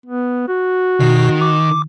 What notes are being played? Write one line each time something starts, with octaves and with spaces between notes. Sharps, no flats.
B3
F#4
B2 D#3
D6